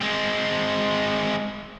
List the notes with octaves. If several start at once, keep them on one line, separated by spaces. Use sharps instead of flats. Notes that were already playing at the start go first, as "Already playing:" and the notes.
G#3 C4